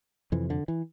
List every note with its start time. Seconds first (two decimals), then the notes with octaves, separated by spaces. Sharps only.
0.32 F2 C3 E3
0.50 D3
0.68 E3